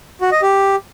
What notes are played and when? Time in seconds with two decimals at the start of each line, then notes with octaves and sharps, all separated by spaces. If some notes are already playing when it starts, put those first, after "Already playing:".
0.21 F#4
0.32 D#5
0.42 G4